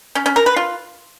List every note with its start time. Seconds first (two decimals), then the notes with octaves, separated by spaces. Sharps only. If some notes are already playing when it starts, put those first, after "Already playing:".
0.15 C#4
0.26 C#4
0.36 A#4
0.46 B4
0.56 F4